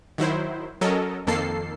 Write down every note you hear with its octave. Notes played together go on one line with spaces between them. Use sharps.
D#3 F#3 E4 C5
F#3 C#4 A4 A#4 D#5
F2 D#3 A#3 A4 C7